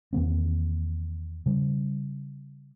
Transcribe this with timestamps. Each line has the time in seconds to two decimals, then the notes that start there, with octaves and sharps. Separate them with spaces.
0.13 E2 D#3 A#3 C4
1.46 C#3 G3